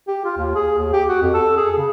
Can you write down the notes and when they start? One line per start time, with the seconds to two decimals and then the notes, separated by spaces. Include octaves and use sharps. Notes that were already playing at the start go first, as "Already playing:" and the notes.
0.07 G4
0.25 F4
0.37 D#2
0.55 G#4
0.78 D#2
0.93 G4
1.09 F#4
1.22 F2
1.34 A4
1.57 G#4
1.78 C#3